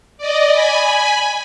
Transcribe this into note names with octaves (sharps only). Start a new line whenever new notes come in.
D5 D#5
G#5 B5